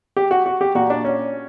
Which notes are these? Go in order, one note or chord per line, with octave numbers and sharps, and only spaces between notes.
G4
F#4
F#4
G4
A#2 F#4
D4
C#4